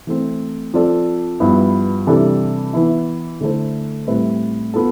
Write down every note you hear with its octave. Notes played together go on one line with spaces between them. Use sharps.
E3 A3 C4
F3 C4 F4 A4 D5
G2 F3 B3 E4
C3 E3 G3 D4 A4
E3 B3 E4
D3 A3 E4 A4 C5
A2 G3 C4 E4 B4
B3 F4 A4